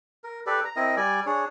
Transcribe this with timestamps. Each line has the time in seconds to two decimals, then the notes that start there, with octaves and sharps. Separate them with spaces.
0.24 A#4
0.47 G4 A4 B4 D5
0.65 A#5
0.76 C4 E4 A#4 D#5
0.97 G3 D5 G#5
1.26 D4 G#4 C#5